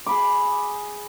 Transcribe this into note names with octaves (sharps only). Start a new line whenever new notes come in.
G#4 B5 D6